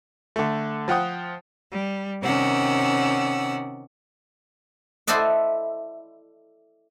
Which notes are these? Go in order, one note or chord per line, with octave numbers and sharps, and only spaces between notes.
D3 A3
F3 F4 F#5 G5 D#6
G3
C3 D#3 C#4 D5 F#5 E6
E4 A4 C5 D5 D#5 F#5